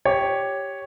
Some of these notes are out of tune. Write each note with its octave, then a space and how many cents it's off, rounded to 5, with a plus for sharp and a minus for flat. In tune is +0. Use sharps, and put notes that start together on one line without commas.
G4 +0 C#5 +0